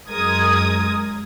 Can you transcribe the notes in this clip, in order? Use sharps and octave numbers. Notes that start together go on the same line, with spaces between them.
F#2 G#3 A#4 D#6 G#6